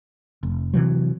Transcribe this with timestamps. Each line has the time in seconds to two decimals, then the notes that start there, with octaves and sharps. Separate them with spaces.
0.43 F1
0.74 C3 E3 F#3